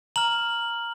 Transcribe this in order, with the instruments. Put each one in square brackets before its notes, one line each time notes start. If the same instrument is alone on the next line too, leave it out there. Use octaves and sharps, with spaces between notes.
[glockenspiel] A#5 F6 F#7